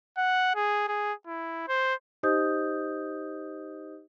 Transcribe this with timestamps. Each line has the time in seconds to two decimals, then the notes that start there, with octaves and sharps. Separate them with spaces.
0.18 F#5
0.56 G#4
0.88 G#4
1.27 E4
1.68 C5
2.23 D#4 G4 C5 D#5 D#6 G6